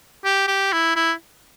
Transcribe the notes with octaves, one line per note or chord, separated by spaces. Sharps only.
G4
G4
E4
E4